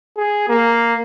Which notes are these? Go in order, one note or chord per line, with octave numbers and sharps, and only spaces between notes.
G#4
A#3